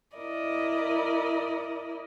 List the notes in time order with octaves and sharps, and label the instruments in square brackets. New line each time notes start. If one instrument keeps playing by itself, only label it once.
[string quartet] E4 A#4 D5 D#5